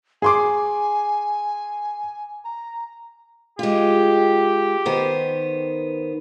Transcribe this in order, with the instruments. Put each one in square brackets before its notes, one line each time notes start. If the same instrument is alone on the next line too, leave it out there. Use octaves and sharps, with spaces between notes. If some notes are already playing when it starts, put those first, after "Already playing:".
[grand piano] G#4 C6 D6 [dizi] G#5
[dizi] A#5
[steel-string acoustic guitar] G#3 F4 [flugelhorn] G4
[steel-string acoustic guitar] D#3 B3 C5